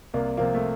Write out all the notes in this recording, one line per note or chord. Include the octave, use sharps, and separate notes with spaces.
C2 A#3
C3 F3 A#3
A3